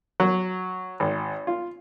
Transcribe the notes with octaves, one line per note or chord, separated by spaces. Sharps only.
F#3
G#1
F4